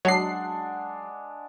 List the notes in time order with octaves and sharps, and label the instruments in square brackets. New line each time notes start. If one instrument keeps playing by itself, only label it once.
[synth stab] F#3 C7 [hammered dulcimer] G#3 D4 [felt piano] F#5 A5